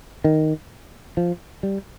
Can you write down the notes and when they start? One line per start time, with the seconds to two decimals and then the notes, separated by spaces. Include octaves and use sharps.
0.24 D#3
1.17 F3
1.63 G3